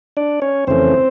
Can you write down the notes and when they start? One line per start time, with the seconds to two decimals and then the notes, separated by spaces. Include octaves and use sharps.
0.17 D4 D5
0.42 C#4 C#5
0.67 F2 C#3 E3 A3 C4 C#4 C5